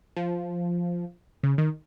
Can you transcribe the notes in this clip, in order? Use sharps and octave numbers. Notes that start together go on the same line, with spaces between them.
F3
C#3
D#3